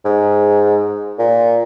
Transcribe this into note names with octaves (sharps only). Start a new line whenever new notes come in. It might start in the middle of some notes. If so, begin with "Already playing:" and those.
G#2
A#2